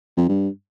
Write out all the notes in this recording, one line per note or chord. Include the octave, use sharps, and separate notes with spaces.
F2
G2